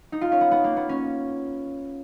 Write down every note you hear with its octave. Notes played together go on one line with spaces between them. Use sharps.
D#4
F4
C#4
B3
B3
A#3
B3
C#4